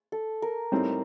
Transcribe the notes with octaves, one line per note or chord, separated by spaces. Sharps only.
A4
A#4
A2 G3 C4 D#4